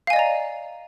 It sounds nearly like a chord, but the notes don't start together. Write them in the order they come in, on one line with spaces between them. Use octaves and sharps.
F5 G#5 D#5 D5 A#5